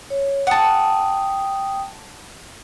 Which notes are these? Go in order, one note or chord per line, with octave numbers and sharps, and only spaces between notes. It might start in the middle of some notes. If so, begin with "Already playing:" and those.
C#5
F#5 G5 A5 D#6